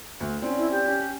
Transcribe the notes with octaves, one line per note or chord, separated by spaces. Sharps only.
D2
C4 C#4 D5
E4
G4
C#4